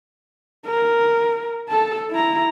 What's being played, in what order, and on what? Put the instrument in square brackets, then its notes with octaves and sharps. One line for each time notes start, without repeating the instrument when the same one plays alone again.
[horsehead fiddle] A#4
A4 A5
E4 A#5